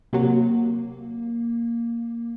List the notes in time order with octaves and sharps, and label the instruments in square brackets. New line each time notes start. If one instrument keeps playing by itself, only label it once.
[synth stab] C3 F#3 [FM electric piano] A#3